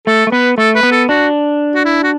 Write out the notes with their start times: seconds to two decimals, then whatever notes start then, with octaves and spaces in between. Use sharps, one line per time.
0.07 A3 A4
0.27 A3
0.32 B3 B4
0.58 A3 A4
0.75 B4
0.83 B3
0.91 A4
1.09 D4 F#4
1.75 F#4
1.85 E4
2.03 F#4